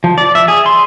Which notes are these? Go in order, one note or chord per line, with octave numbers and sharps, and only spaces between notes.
F3
D5
E5
G#4
C6